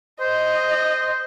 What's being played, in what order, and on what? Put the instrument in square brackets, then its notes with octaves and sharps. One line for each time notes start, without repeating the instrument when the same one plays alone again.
[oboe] C5 [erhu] D#5